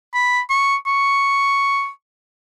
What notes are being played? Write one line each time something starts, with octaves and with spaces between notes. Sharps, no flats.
B5
C#6
C#6